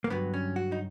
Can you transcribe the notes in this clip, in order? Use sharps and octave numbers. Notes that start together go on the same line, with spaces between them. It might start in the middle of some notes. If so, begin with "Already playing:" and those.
A#3
G2 D3 F#3 B3
C#4
F#4
D#4